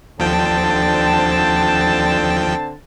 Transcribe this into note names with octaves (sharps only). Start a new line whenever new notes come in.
D#2 D3 F3 C4 G5 A5